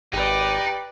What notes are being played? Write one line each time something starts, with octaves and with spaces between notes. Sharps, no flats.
G#1 D#4 G4 B4 D5